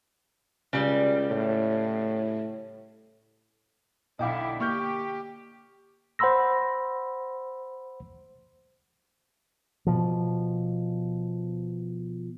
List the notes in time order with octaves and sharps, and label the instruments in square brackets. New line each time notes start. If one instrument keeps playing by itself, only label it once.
[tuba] C#2 [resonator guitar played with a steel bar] C#3 G3
[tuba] A2
[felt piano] B1 F5 [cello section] D3 E4 [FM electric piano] D#5 G5 D6
[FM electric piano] A#3 [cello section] G4 [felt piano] C#6 F6 G6
[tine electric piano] C5 F#5 B5 C6 E6 A#6
[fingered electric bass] B2 F3